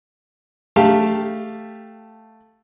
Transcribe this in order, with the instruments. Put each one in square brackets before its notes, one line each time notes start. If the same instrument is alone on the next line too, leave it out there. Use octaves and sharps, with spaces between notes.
[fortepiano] A3 G4 F5 A5